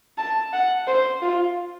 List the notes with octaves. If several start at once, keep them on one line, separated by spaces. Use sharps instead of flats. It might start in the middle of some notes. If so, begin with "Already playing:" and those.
A5
F#5
C5
F4